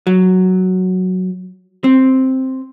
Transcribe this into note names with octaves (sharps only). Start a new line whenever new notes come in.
F#3
C4